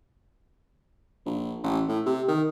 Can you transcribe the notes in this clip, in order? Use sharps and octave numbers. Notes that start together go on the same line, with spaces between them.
A#1
A1
A2
C3
D#3